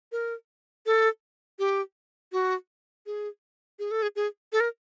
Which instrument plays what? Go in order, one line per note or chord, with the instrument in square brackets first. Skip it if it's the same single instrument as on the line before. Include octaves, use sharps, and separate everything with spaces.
[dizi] A#4
A4
G4
F#4
G#4
G#4
A4
G#4
G#4
A4
A#4